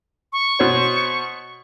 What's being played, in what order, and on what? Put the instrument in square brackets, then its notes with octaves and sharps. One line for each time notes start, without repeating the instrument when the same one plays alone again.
[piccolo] C#6
[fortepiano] B2 C5 C#5